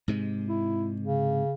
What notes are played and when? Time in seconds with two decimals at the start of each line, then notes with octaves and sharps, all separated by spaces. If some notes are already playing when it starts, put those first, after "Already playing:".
0.08 G#2 C3 G#3
0.48 E4
1.02 C#3